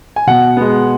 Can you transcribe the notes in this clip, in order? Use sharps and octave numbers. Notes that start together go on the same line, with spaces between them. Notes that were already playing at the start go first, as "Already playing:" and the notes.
G#5
B2 F#5
G#3 B3